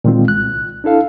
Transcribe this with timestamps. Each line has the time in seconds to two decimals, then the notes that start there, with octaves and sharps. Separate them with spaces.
0.04 A#2 D#3 G#3 C4 F4
0.28 C2 F#6
0.84 D4 E4 A4 F5